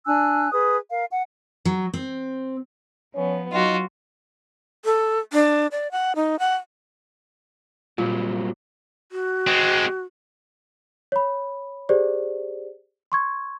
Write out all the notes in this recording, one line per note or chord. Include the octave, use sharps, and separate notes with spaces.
D4 G#5 E6 F#6
G#4 B4 D#6
A#4 F5
F#5
F#3
C4
F3 B3 C#4
F#3 D#4 F4 F#4
A4
D4
D5
F#5
D#4
F#5
A#2 F#3 G3 C4
F#4
G#3 C4
C#5 B5
G4 G#4 C5 D5
C6 C#6 G#6